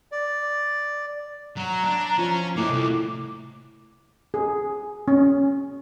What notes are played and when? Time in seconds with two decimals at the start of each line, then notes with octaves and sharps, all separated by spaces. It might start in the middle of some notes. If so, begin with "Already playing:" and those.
0.12 D5
1.57 F#3 F#4 A#5
1.83 D4
2.18 F3 C#4
2.57 A2 A#3 D#5 D6
2.70 C2
4.34 G#4
5.08 C#4